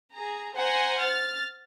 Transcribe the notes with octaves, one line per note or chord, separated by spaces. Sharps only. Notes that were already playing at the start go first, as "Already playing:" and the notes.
G#4 A#5
C5 F#5 G#5 A#5
F6 A6